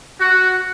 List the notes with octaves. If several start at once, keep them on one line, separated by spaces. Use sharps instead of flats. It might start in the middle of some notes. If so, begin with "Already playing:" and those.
F#4